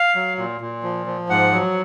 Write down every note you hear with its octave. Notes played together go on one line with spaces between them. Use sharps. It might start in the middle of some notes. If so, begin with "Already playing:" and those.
Already playing: F5
F#3
A#2
A#2
F3
F3
G#2 F#5
F#3